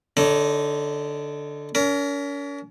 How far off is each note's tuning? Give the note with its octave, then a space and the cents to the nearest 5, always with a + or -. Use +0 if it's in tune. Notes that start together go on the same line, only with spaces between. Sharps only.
D3 +0 D#4 +0 C#5 +35
C#4 +40 A#4 +0